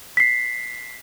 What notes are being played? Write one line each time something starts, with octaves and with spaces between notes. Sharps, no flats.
B6 C7